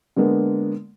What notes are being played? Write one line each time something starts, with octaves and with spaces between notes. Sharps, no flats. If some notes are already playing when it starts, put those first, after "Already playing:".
D3 G#3 A#3 B3